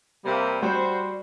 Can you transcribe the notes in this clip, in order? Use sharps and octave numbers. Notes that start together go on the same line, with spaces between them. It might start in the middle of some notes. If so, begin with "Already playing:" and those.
C3 G3 A#3
G3 F#4 C5